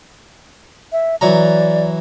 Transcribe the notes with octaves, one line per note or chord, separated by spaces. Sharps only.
E5
E3 F#3 D5 A#5